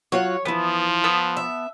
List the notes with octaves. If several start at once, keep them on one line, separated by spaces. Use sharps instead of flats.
F#3 F4 C#5 F#5
E3 F3 B3 E4
B3 A5 E6
E5